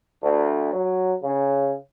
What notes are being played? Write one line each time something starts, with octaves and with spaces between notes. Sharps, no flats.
D2
F#3
C#3